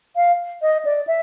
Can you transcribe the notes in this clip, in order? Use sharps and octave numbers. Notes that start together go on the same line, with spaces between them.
F5
D#5
D5
E5